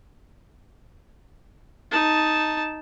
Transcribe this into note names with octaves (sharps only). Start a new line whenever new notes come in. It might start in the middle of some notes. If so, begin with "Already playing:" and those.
D#4 A5